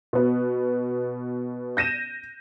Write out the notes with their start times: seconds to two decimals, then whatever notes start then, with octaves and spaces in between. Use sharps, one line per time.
0.13 B2 B3
1.77 G6 A#6 D#7 E7